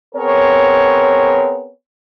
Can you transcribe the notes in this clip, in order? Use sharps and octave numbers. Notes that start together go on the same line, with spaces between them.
B3 C4 G#4 A#4 C#5